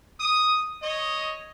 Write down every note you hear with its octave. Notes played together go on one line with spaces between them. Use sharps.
D#6
C#5 D#5